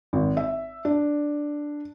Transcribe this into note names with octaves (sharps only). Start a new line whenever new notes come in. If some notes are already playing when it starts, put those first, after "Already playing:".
G#1
E5
D4